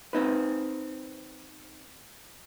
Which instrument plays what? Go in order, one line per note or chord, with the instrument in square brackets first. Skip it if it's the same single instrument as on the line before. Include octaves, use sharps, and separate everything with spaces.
[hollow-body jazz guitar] C4 D#4 B4